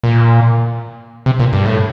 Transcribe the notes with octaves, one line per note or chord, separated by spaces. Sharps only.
A#2
C3
A#2
G2
A2